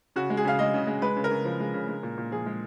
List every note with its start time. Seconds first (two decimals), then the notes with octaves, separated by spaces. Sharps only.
0.16 C#3 F#4
0.30 G#3
0.37 G#4
0.45 C#3 F5
0.59 G#3 D#5
0.74 C#3
0.87 G#3
1.02 G#3 B4
1.16 C#3
1.24 A#4
1.31 C#3
1.45 F3
1.60 G#3
1.74 C#3
1.88 G#3
2.03 A#2
2.18 A#2
2.32 F3 G#4
2.46 G#3